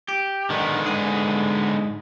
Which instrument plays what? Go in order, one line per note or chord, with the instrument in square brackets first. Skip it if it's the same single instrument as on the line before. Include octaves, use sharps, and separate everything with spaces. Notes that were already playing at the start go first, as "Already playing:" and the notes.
[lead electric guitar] G4
[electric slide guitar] D3 G#3 B3 [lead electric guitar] D#3
[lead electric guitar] G#2 G#4